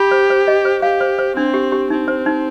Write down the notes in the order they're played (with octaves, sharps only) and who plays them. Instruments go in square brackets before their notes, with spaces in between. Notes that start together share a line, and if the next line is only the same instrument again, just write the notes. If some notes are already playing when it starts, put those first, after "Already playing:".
Already playing: [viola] G4 [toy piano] B5
[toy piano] C5
C5
D#5
C5
[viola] G4 [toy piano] F5
[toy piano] C5
C5
[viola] C4 [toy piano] D4
[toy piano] G4
G4
[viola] C4 [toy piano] D#4
[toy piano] C5
D#4